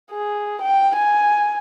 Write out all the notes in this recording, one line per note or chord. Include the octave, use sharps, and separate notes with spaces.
G#4
G5
G#5